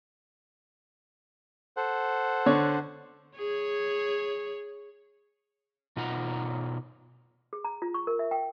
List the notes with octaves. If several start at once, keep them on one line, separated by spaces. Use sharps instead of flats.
A4 C5 F#5
D3 C#5
G#4 C#5
B2 D#4 F4 F#5 A5 A#5
G#4
A#5
F4
C#6
A#4
E5
G5